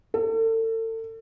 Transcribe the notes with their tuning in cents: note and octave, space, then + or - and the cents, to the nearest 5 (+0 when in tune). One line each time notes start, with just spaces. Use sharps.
A4 +35